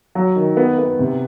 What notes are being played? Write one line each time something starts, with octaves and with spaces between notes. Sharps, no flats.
F#3
D#3
B3
B3
C3